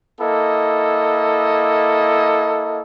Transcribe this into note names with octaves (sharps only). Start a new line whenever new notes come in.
A#3 E4 A4 D#5